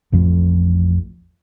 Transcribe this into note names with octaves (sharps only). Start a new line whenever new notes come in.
A1 F2 A2 F3